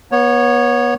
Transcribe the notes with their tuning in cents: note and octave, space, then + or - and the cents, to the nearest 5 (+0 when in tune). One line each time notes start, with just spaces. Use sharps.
B3 -30 C#5 +0